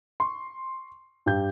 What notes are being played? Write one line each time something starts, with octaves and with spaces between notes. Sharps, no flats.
C6 C#6
G2 G4 G5 G6